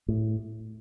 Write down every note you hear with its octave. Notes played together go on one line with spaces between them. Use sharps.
A2